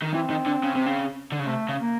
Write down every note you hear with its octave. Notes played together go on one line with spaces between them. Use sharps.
D#3
E3 C4
D#3
D3
C#3
C3
C#3
D3
C#3
C3 A3
C#3
A#3